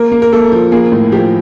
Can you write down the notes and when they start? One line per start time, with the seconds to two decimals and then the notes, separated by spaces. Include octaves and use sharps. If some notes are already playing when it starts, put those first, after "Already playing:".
Already playing: A#3 A#4
0.12 A#3
0.22 A#4
0.32 A#3 A4
0.52 F3
0.72 A#3 G#4
0.92 A2
1.12 F3 G4